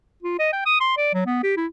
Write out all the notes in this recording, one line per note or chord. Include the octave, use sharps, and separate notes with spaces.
F4
D#5
G5
D#6
C6
D5
F#3
B3
G4
E4